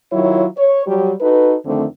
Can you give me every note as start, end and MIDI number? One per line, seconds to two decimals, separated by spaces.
0.12 0.46 51
0.12 0.46 54
0.12 0.46 64
0.12 0.46 65
0.12 0.46 73
0.58 0.85 73
0.86 1.13 54
0.86 1.13 55
1.21 1.56 63
1.21 1.56 66
1.21 1.56 69
1.21 1.56 71
1.65 1.86 41
1.65 1.86 50
1.65 1.86 51
1.65 1.86 57
1.65 1.86 60